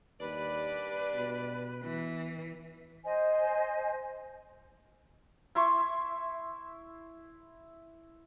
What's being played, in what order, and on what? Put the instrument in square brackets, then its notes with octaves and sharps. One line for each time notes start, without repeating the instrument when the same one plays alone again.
[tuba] D#2 [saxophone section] G3 D4 D5 [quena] B4
[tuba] B2
[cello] E3 [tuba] B3
[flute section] C5 D#5 G#5
[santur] E4 E5 C6 C#6